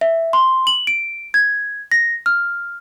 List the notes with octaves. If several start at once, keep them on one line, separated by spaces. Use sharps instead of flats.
E5
C6
F#7
D7
G#6
A#6
F6